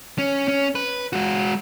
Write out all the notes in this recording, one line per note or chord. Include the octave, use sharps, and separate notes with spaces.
C#4
C#4
B4
G#3 F#4